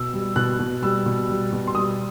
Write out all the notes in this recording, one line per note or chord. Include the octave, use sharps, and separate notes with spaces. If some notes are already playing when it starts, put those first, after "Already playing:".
Already playing: B2 E6
G3
B2 F#6
B2
G3 E6
B2
G3
B2
C6
G3 D#6